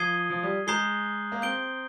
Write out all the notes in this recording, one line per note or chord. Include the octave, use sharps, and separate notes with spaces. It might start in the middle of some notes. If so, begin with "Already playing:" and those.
Already playing: F3 D#6 G#6 C7 D#7 G7
F3
G3
G#3 A#5 D#6 G6 C7 G7
A#3
C4 G6 D7 G7